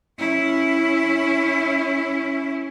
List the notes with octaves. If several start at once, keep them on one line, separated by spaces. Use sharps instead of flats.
C#4 E4